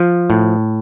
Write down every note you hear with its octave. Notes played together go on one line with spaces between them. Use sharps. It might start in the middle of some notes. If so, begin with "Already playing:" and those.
Already playing: F3
A2